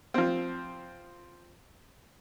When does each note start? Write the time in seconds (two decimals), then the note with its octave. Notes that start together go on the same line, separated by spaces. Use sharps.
0.14 F3 C4